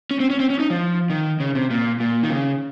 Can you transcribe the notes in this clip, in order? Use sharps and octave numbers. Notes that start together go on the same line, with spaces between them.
C#4
C4
C#4
C4
C#4
D#4
F3
D#3
C#3
C3
A#2
A#2
D#3
C#3